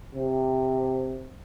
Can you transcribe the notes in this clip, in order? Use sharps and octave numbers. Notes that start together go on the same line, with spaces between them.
C3